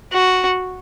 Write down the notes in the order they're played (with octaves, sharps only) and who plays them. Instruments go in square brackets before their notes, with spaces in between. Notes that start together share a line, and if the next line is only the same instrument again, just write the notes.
[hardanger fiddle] F#4